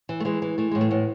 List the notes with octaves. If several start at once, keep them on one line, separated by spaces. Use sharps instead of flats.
E3
A3
E3 G#3
E3
E3 A3
A2 G#3
A3
A2 B3